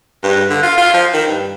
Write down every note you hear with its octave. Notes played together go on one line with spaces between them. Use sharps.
G2
D3
F4
F4
F3
D#3
G2